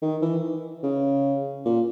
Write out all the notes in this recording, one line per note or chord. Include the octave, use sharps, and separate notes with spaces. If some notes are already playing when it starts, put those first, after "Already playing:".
D#3
E3
C#3
A#2